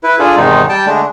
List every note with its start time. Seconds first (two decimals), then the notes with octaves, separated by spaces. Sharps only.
0.04 E4 B4
0.19 D4 F4 G#4 A4
0.37 E2 G#2 C3 D#3 G#3 D#4
0.69 G3 G5 A5
0.87 D3 G#3 A3 D4